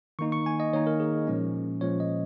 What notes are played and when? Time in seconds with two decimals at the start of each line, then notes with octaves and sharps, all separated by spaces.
0.19 D#3 A#3 D#4 C#6
0.32 C#6
0.46 G#5
0.60 D#5
0.73 D#3 A#3 D#4 C#5
0.87 A#4
1.00 G#4
1.27 A#2 F3 G#3 C#4
1.81 A#2 F3 G#3 C#4 C#5
2.00 D#5